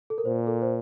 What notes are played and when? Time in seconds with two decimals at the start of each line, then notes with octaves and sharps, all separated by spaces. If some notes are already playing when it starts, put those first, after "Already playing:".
0.10 A4
0.18 A#4
0.25 A#2 C5
0.47 A4
0.62 C5